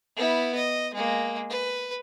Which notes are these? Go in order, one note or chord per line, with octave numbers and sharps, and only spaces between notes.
B3 E4
D#5
G#3 A#3
B4